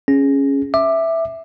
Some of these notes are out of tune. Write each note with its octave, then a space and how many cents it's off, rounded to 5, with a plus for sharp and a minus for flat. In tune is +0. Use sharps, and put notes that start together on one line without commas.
C#4 +0 G#4 +0
E5 +0 D6 +15